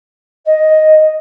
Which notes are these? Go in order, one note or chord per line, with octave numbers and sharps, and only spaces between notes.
D#5